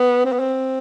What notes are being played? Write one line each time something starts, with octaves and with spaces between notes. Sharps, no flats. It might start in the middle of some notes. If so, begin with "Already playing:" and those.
Already playing: B3
C4
B3
C4